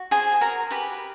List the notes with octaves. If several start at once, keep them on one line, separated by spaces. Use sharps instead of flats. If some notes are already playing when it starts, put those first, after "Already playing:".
Already playing: F#4
G#4 C5 G#5
F#4 A#4 A#5
G4 B4 B5